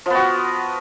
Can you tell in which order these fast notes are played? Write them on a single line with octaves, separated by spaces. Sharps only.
F3 B3 F#4